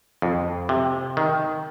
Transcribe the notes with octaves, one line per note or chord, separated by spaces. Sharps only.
F2
C3
D#3